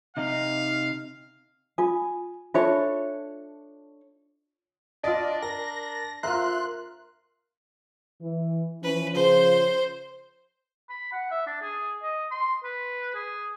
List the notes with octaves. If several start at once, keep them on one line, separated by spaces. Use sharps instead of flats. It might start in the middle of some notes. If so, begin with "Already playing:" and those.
C3 D#4 F5
F4 G#5 D#6
D4 F4 A4 C#5 E5 G#5
D4 F4 D5 D#5
A#4 A#6
F4 A#4 E5 C6 F#6
E3
E3 F3 C#4 B4
C#3 F3 C5
B5
F#5
E5
D4
G#4
D#5
C6
B4
G#4